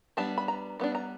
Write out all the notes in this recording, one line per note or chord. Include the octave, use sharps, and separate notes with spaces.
G3 B3 D4 A5
B5
A#5
G3 B3 D4
A#5